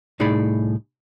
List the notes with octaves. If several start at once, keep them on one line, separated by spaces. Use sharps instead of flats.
C2 A2 D#4 G#4 D5 B5